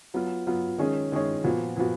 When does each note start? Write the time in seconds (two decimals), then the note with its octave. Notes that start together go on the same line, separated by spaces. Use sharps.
0.14 F#3 B3 F4
0.47 F#3 B3 F4
0.78 D#3 G#3 C#4 G#4 C#5
1.12 D#3 G#3 C#4 G#4 C#5
1.44 A#2 F3 B3 F#4
1.76 A#2 F3 B3 F#4